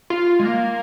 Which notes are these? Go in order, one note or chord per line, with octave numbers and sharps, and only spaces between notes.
F4
G#3
A#3